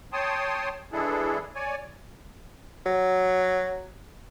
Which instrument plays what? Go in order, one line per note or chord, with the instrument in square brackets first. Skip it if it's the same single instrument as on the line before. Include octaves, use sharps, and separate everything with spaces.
[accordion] C#5 G5 A5 C6 D#6
E3 G#3 D4 E4 G#4 A4
C#5 D5 G#5
[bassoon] F#3